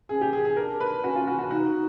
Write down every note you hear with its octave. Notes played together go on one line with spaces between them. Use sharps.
C#4 G#4
G4
G#4
G#4
D4 A#4
B4
C#4 F#4
F4
F#4
D4 F#4
D#4 F#4